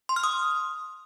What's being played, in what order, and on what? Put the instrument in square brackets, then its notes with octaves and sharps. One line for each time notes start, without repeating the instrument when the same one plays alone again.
[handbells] C6
F6
D#6